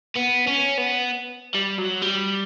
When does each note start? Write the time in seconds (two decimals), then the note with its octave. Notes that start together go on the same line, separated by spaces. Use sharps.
0.16 B3
0.47 C#4
0.78 B3
1.55 G3
1.79 F#3
2.02 G3